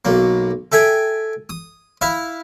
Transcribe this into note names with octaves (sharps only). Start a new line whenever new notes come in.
B1 A#3
A4 E5 G5 G#5
D#6
E4 E5 F5